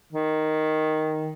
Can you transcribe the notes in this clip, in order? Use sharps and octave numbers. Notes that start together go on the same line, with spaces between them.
D#3